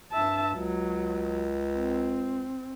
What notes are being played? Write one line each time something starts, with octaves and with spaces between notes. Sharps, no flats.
G2 E5 A5
C#2 F#3
C4